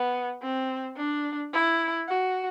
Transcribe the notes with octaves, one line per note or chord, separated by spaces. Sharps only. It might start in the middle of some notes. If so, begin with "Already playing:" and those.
Already playing: B3
C4
D4
E4
F#4